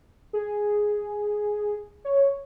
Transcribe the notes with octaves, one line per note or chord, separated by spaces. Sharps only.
G#4
C#5